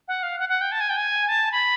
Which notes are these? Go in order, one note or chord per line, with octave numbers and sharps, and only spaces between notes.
F#5
F5
F#5
F#5
G5
A5
G#5
G5
G#5
A5
B5